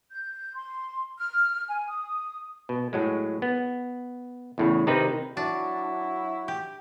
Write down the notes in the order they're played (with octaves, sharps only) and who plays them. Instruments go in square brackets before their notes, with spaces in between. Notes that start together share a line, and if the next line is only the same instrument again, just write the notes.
[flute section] G6
C6
F6
G#5
D#6
[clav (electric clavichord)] B2
A2 F#3 G#3
B3
E2 A2 C#3
C3 D#3 C4 D#4 B4
[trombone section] F#3 E4 [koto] D4 [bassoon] F#4
[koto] G4